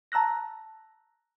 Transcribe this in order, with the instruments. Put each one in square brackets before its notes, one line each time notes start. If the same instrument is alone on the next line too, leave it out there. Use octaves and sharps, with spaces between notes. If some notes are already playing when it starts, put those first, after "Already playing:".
[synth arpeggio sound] A5 A#5 E6 F#6 A#6